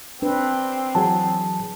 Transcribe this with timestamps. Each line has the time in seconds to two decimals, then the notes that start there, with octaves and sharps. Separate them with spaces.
0.22 C4 D4 B4
0.95 E3 F#3 G#4 A5